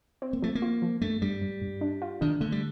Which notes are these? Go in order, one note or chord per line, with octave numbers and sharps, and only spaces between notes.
C4
A#3
F3 A3
A#3
F4
F3
G2 A3
G2 G3
G2
G2
D4
F4
D#3 D4
D3 A3
G3